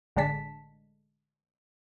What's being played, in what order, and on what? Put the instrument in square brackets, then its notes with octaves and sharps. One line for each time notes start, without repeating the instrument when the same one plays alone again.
[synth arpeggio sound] A1 D3 G#3 D4 A5 B6